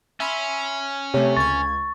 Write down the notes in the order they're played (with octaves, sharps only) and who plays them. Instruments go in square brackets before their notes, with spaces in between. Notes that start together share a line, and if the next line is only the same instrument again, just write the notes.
[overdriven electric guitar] C#4 [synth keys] E5 B5 C6
[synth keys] C3 A3 [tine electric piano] G4 C#5
[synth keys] C#2 G#6 [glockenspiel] C#6 [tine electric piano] A6